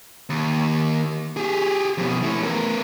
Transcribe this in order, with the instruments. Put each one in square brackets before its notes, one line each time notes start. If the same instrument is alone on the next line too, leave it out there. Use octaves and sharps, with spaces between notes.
[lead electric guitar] D#2
G4 G#4
F2 B2
E3 A3
B3 A#4